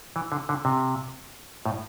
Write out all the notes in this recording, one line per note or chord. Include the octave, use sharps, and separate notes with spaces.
E3
D3
D3
C3
A2